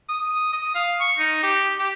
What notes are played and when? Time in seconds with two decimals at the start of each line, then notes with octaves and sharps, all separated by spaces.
0.09 D#6
0.53 D#6
0.75 F5
1.00 C#6
1.19 D#4
1.43 G4
1.79 G4